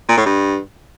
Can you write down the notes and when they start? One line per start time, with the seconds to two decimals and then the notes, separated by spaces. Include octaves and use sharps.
0.09 A#2
0.17 A2
0.26 G2